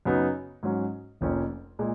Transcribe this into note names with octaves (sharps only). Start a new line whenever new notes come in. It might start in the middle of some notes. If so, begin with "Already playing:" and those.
F#2 C#3 F#3 B3 D#4
G#2 F#3 C#4
F1 F2 F3 A#3 C#4
A#2 G#3